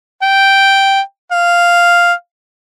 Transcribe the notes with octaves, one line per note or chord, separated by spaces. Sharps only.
G5
F5